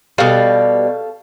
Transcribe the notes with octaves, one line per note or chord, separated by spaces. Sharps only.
B2 G3 A4 F5